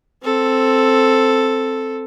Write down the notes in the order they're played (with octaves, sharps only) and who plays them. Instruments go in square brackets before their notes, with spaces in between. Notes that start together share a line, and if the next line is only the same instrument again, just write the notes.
[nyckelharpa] C4 A4